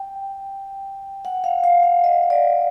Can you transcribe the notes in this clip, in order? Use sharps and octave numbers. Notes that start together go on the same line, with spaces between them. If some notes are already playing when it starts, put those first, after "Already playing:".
Already playing: G5
F#5
F5
F5
F5
D#5
D5